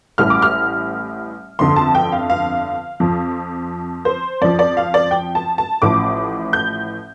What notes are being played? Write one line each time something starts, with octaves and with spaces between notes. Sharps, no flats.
A1 A2 G3 F6
D6
F6
G1 F2 D3 C6
A5
G5
F5
F5
F2 F3
C5
F2 F3 D5
D5
F5
D5
G5
A5
A5
A1 A2 F3 D6
G6